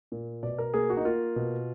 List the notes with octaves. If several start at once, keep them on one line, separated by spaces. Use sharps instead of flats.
A#2
B2 D5
A#4
A#3 G#4
F#4
D#4
A#3 F4
B2